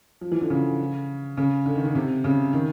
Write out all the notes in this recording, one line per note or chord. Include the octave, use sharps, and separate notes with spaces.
F3
E3
D3
C#3
C#3
D3
D#3
D3
C3
C#3
D#3